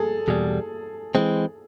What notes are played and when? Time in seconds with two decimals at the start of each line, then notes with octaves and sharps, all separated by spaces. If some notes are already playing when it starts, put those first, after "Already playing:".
Already playing: G#4 A4
0.27 E2 B2 G3 G#4
1.15 E3 G#3 C4